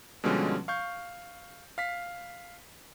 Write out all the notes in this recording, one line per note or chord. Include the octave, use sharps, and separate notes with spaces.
B2 D3 F3 G3 G#3 C#4
F5 C#6 G6
F5 B6